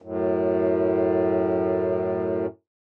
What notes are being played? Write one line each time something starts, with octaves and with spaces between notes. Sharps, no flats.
F#2 A2